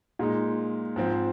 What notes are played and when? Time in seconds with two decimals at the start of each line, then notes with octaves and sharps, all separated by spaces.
0.19 A#2 G#3 D#4
0.96 G#2 F3 C4